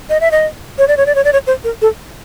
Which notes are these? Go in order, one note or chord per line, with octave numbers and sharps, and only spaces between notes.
D#5
E5
D#5
C#5
D5
C#5
D5
C#5
D5
C#5
C5
A#4
A4